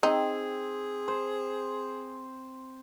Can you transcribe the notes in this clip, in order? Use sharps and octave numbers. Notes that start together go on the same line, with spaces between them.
C4 D#4 G#4
C5